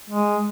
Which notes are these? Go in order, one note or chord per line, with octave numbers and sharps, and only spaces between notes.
G#3